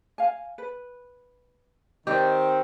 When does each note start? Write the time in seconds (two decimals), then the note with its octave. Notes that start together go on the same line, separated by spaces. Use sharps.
0.18 F5 G#5
0.58 B4
2.07 D#3 C4 G4 D5 D#5